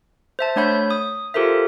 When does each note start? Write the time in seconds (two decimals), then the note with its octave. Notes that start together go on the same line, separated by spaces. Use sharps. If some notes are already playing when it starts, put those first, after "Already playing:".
0.39 C5 E5 A5
0.56 A3 D4 C#5 F#5 B5 G6
0.91 D#6
1.34 F4 G4 A4 A#4 C5 E5